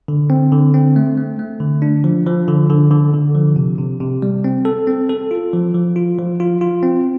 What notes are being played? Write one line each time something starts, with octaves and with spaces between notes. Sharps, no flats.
D3
C4
D3
C4
A3
A3
A3
D3
D4
F3
F3
D3
D3
D3
D3
F3
C3
C3
C3
G3
C4
A4
C4
A4
F4
F3
F3
F4
F3
F4
F4
C4